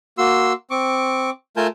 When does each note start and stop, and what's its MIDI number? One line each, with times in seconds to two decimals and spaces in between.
0.18 0.53 58
0.18 0.53 66
0.18 0.53 84
0.18 0.53 88
0.71 1.30 60
0.71 1.30 85
0.71 1.30 86
1.57 1.67 57
1.57 1.67 65
1.57 1.67 70
1.57 1.67 80
1.57 1.67 81
1.57 1.67 91